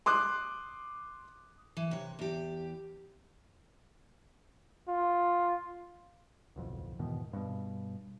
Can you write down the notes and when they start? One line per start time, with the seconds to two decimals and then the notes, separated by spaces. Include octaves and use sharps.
0.06 C6 D6 D#6 F#6
1.77 E3
1.91 C3 C#5
2.19 E2 G4
4.89 F4
6.56 D1 B1 F2
6.99 E2 G#2 B2 D#3
7.33 G2 B2